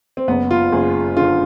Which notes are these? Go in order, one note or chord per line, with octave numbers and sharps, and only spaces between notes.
C4
F#1 B3
F4
F#1 G#4
D3 F4